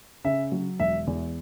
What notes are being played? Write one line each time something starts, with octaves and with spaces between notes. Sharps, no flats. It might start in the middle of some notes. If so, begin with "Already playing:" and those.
C#3 E5
F#3
E1 E5
E2